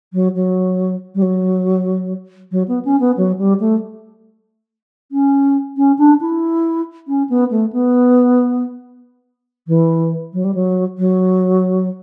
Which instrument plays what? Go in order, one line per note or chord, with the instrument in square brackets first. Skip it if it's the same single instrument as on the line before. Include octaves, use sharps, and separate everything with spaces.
[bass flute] F#3
F#3
G3
F#3
F#3
B3
C#4
B3
F#3
G3
A3
C#4
C#4
D4
E4
C#4
B3
A3
B3
E3
F#3
G3
F#3
F#3